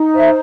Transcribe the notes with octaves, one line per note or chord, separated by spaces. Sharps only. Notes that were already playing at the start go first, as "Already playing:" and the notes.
Already playing: D#4
C5 E5